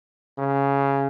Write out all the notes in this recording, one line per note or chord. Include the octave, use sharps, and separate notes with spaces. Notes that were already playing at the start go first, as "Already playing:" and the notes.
C#3